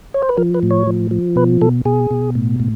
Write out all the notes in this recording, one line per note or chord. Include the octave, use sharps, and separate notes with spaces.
C#5
C5
B4
F3 A#4
B4
A2
C#5
F3
F3
B2 B4
B2 A4
B2 G#4
B2
A2
A2